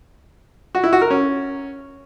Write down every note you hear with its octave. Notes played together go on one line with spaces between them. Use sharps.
F#4
E4
F#4
A#4
C#4